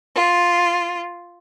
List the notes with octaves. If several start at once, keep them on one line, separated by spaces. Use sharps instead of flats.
F4